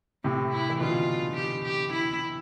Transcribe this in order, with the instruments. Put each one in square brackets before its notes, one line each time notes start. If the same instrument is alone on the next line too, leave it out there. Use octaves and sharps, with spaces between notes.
[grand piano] A2 C3 [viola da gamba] C4
[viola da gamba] E4
[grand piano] E3
[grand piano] B2 D3 [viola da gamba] F4
[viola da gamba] G4
G4
E4